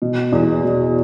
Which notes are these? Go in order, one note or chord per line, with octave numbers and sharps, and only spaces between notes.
B2
E2
B2